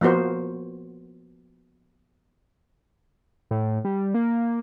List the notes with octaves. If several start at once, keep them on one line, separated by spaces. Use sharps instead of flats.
F3 A#3 B3 F#4 C5
A2
G3
A#3